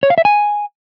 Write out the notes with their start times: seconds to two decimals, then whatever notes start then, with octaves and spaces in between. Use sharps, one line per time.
0.03 C#5
0.10 F5
0.18 E5
0.25 G#5